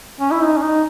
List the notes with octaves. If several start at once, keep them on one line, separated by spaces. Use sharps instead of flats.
C#4
E4
D#4
C#4
D#4